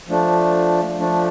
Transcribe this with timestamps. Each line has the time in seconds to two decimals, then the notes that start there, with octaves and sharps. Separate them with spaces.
0.08 F3 A3 D4
0.99 F3 A3 D4